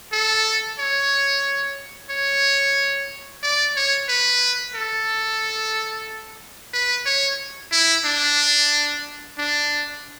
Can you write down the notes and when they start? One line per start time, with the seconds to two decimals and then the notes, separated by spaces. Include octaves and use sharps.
0.12 A4
0.79 C#5
2.10 C#5
3.43 D5
3.76 C#5
4.09 B4
4.75 A4
6.73 B4
7.06 C#5
7.72 E4
8.05 D4
9.38 D4